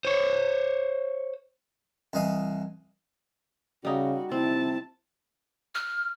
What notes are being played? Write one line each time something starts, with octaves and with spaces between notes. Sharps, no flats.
C5 C#5
C2 E3 D#5 F5 D#6
C#3 G3 D#4 F#4
C3 C4 E4 A5
F6